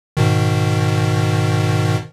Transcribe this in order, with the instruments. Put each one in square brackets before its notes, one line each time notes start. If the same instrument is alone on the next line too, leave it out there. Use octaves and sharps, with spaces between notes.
[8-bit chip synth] G#2 B2 D#3